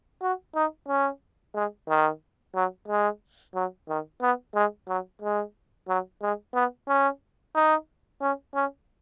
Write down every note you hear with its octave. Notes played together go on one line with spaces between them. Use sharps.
F#4
D#4
C#4
G#3
D#3
F#3
G#3
F#3
D#3
B3
G#3
F#3
G#3
F#3
G#3
B3
C#4
D#4
C#4
C#4